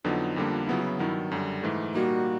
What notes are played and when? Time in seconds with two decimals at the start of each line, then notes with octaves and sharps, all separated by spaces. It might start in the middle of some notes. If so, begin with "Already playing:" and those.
0.04 F2 D3 F#3 B3 D#4 F4
0.36 F2 D3 G3 A#3 D4
0.68 C#3 F#3 B3 E4 F4
0.84 E4
0.99 G2 D#3 F#3 E4
1.31 F#2 D3 G3
1.63 G#2 E3 A3
1.94 A#2 G3 A#3 D#4 F#4